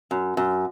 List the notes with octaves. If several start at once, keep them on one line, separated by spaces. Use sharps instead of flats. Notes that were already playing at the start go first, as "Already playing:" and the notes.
F#2
F#2